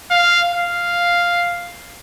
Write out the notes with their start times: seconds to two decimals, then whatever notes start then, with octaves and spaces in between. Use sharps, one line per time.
0.11 F5
0.53 F5